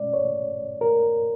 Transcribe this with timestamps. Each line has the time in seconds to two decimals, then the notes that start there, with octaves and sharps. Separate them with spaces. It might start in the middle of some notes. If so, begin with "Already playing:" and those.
Already playing: B2 G#3 C#4 D5
0.14 C#5
0.81 A#4